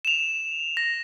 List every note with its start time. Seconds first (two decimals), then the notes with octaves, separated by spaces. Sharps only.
0.05 E7 F7
0.77 A#6